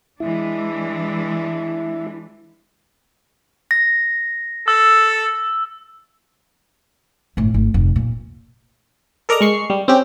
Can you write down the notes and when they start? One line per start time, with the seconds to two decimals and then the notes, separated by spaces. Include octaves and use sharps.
0.20 E3 G#3 D4 E4
3.71 A#6
4.68 A4 E6
7.37 G1 A2
7.54 G#1
7.74 F1
7.96 A#2
9.29 A4 A#4 D5 D#5 A#5
9.41 G#3 C#6 C7
9.70 G3
9.88 C4 C#4 G4